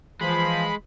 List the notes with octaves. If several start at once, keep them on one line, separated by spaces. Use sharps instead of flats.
E3 F3 G#3 B5